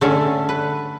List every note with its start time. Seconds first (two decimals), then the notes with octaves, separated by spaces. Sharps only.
0.01 D3 A3 C#4 A4
0.49 B4